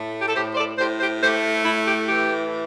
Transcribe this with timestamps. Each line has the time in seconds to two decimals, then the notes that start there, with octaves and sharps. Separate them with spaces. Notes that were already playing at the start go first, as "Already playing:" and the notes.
Already playing: A2 A3
0.22 G4
0.29 A4
0.36 A2 G4 C5
0.53 C5
0.57 A4 D5
0.79 A2 G4 C5
1.01 G4 C5
1.22 A3 G4 C5
1.65 A2 E4
1.88 G4
2.09 E3 G4